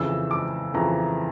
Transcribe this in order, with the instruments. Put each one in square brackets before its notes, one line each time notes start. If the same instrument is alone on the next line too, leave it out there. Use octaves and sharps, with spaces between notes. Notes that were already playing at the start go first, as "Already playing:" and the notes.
Already playing: [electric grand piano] F2 C#3 E3 [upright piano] E6
[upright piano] D6
[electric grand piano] F2 C#3 E3 [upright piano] A#5